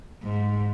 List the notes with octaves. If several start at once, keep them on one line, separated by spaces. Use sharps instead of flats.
G#2